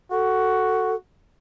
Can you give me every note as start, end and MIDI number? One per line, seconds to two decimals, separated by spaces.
0.12 0.96 66
0.12 0.95 69